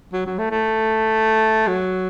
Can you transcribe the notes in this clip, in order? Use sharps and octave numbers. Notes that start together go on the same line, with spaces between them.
F#3
F#3
A3
A3
F#3